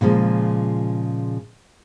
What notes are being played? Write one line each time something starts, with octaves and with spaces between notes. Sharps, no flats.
A#2 C#3 F3 G#3